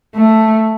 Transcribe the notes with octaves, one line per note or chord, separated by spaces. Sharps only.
A3